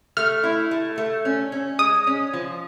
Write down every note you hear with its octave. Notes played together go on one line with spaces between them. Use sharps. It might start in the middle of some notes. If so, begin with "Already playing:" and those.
A3 F6
E4
A3
A3
C#4
C#4
G#3 D#6
C#4
F3